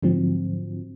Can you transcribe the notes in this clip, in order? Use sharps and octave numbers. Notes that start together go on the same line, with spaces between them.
G#2 D3 F3 F#3 C4